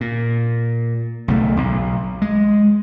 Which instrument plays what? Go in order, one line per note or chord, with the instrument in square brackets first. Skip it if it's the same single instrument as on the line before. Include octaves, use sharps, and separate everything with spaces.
[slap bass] A#2
B1 C#3 A3
B1
G#3